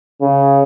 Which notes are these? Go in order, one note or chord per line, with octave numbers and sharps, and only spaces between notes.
C#3